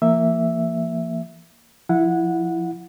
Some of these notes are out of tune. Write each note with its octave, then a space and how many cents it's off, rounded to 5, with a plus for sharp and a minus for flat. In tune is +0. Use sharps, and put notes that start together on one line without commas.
F3 -45 A#3 -15 E5 +0
F3 +0 E4 +10 F#5 -15